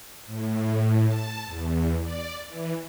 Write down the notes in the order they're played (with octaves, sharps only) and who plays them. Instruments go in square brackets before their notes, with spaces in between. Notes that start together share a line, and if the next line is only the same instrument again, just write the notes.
[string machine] A2
A5
E2
D5
E3